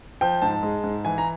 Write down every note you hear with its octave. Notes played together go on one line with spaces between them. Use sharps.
F3 G5
G#2 A5
G#3
G#2
E3 G#5
A#5